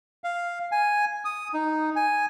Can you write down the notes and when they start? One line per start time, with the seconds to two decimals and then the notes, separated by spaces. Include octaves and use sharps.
0.24 F5
0.72 G#5
1.25 D#6
1.54 D#4
1.96 G#5